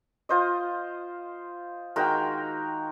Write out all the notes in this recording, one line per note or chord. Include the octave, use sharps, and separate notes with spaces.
F4 C5 D#5
D#3 G#3 F#4 A#4 G5 A#5